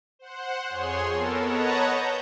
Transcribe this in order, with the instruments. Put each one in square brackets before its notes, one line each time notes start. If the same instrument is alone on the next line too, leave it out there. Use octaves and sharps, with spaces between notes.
[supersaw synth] C5 F#5
F2 G#4 C#5 C6
B3 A4 A#4
B4 C#5 D#5 F#5 A5 A#5
G6